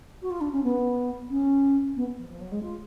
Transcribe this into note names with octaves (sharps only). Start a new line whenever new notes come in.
F#4
F4
D4
C#4
B3
C#4
B3
F3
F3
F#3
G#3
F4